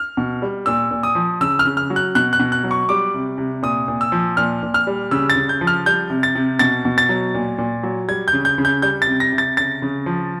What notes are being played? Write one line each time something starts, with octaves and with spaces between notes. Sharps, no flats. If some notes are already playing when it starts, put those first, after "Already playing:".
Already playing: F6
B2
G3
A#2 E6
A#2
D#6
F3
C#3 E6
F6
C#3
F6
F#3
F#6
B2 F#6
F#6
B2
F#6
F#3
C#6
G3 D6
C3
C3
A#2 D#6
A#2
E6
F3
A#2 F6
A#2
F6
G3
C#3 E6
A6
C#3
G6
F3
F6
G3 G6
C3
A6
C3
B2 A6
B2
A6
F#3
A#2
A#2
F#3
G3 G#6
G6
C#3
G6
C#3
G6
G3 G6
A6
C3
A#6
C3
A6
C#3 A6
C#3
F3